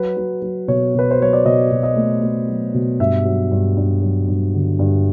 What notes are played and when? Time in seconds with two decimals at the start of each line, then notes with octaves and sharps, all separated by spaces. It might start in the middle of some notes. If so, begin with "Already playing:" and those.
Already playing: F#3 B4
0.17 F#3
0.42 F#3
0.68 B2 C#5
0.95 B2 B4
1.11 C5
1.20 F#3 C#5
1.33 D5
1.45 B2 D#5
1.72 B2
1.83 D#5
1.96 A3
2.22 A3
2.49 F#3
2.74 B2
2.99 G2 E5
3.25 F#3
3.52 G2
3.77 G2
4.02 F#3
4.28 G2
4.54 D3
4.79 G2